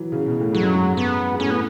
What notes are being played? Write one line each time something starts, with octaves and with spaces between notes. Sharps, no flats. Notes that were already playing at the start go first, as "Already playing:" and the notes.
Already playing: E3 F#3
C#3
B2
A2
G#2 F#3
F#2
G#2
B3
G#2
A2 C#4
B3